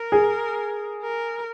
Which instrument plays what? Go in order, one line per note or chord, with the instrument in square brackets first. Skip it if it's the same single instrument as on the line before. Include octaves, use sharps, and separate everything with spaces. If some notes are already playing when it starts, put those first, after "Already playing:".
Already playing: [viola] A#4
[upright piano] G#4
[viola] A#4